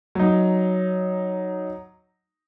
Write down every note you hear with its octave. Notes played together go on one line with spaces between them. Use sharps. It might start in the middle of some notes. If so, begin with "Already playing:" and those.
F#3 D#4